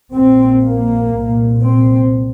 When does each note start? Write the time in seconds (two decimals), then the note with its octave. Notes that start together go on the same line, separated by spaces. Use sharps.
0.14 A#1 A#2 C4
0.63 A#3
1.14 C2 A#2
1.62 C4